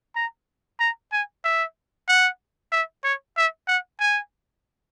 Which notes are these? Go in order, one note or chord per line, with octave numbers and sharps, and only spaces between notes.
A#5
A#5
G#5
E5
F#5
E5
C#5
E5
F#5
G#5